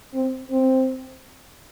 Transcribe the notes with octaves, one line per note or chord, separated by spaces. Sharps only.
C4
C4